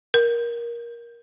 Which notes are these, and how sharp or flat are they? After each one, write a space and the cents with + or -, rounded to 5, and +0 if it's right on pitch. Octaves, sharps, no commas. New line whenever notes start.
A#4 +15